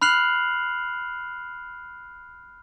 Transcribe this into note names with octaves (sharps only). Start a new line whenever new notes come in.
B5 F6 F#6 C7 F7 F#7